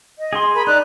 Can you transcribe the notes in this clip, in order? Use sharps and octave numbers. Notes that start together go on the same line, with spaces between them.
D#5
G#4 C6
A#4 G#5 B5
D#4 D5 F#6